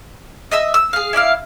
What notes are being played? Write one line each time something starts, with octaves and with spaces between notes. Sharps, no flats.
D#5 E5 E6
E6
G#4 F5
E4 D5 D#5 F5